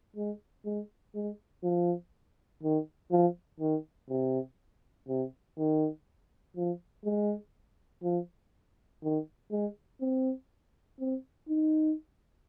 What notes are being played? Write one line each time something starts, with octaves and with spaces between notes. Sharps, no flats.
G#3
G#3
G#3
F3
D#3
F3
D#3
C3
C3
D#3
F3
G#3
F3
D#3
G#3
C4
C4
D#4